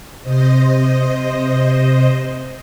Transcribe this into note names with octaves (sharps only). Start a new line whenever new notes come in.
C3 C5 D#5